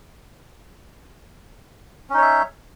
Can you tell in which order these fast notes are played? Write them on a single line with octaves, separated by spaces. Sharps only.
C#4 D#4 C#5 E5